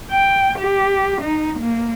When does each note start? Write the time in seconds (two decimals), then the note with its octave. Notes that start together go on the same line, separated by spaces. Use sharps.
0.11 G5
0.59 G4
1.22 D#4
1.60 A#3